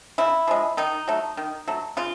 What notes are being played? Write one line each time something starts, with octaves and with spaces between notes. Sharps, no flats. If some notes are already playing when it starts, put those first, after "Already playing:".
C#3 E4
F3 G#3
D#3 D#4
F#3 A3
D#3
F#3 A3
C#3 F4